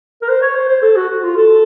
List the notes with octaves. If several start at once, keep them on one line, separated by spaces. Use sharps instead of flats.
A#4
C5
C#5
C5
C5
A4
F#4
F#4
F4
A4